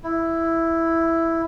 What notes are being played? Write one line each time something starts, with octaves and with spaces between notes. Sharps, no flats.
E4